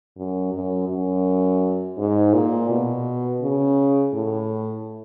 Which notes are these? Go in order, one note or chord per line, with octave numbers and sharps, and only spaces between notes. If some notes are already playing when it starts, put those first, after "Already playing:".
F#2
F#2
F#2
G#2
A#2
B2
C#3
A2